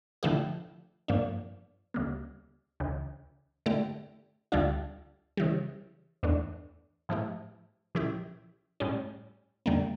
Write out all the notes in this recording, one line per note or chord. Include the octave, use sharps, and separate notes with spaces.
D3 F3 A3 E4 G4
G2 F3 A#3 D4
D2 C#3 G3 A#3
D2 C#3 E3
D3 A3 E4 G4
D2 D3 G3 D4 F4
C#3 E3 G3
E2 E3 A3 D4
A2 F3 A3 E4 G4
A#2 F3 C#4 E4 G4
A2 G3 C#4
F2 D3 G3 A#3